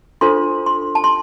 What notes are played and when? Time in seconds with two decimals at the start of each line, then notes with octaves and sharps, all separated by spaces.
0.21 D4 F4 A4 C5 C6
0.66 C6
0.95 A5
1.04 C6